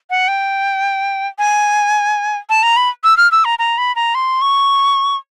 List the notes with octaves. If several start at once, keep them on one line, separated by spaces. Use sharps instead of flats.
F#5
G5
G#5
A5
A#5
B5
E6
F6
E6
A#5
A#5
B5
A#5
C6
C#6